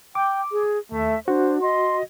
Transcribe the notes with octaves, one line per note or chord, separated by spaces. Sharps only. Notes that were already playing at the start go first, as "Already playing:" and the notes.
G5 D6
G#4
D#2 A3 E5
D4 F#4 C5
D#5 C6